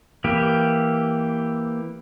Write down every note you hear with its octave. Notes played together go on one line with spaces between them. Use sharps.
E3 A#3 G4